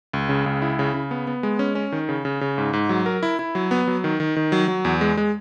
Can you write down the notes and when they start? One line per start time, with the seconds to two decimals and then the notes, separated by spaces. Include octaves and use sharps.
0.13 C#2
0.29 C#3
0.46 C#2
0.62 E4
0.79 C#3
0.94 C#3
1.11 B3
1.27 B3
1.43 G#3
1.59 C#4
1.75 C#4
1.92 D#3
2.09 C#3
2.25 C#3
2.41 C#3
2.58 G#2
2.73 G#2
2.89 F#3
3.06 A#4
3.23 E4
3.39 E4
3.55 F#3
3.71 B3
3.88 F#3
4.04 D#3
4.20 D#3
4.36 D#3
4.52 F#3
4.68 F#3
4.85 E2
5.01 G#3
5.17 G#3